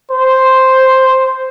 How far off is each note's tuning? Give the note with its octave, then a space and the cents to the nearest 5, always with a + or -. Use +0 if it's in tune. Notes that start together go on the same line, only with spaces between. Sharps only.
C5 +0